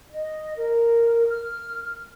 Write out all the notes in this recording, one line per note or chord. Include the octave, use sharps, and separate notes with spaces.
D#5
A#4
F6